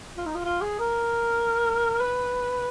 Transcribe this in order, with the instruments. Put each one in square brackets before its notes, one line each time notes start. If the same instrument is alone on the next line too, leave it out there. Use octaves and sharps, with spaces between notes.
[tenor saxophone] F4
D#4
F4
F4
G#4
A#4
B4